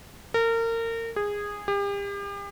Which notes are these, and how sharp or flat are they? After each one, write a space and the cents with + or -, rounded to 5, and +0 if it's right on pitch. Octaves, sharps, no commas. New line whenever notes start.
A#4 -30
G#4 -15
G4 +40